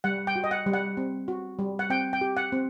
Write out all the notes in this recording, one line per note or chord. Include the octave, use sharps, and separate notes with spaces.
G3 F#5
G5
F#4
D#5
F#5
G3
F#5
C4
F#4
G3
F#5
C4 G5
G5
G4
F#5
C4